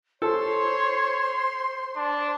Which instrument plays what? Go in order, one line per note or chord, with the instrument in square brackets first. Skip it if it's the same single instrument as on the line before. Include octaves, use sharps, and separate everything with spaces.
[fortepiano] A4 [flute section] C5 C6 [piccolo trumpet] C#5
[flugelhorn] D4 [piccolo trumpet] A5